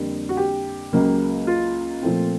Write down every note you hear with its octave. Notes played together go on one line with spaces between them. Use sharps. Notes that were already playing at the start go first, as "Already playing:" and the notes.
Already playing: F2 D3 G3 A#3
F#4
G4
C#2 C#3 F#3 A#3
F4
A#2 F3 A3 C4